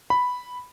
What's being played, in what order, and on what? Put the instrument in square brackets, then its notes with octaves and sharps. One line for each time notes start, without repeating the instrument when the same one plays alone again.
[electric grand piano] B5